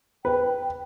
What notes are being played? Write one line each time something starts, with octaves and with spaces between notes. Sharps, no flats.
B4 G5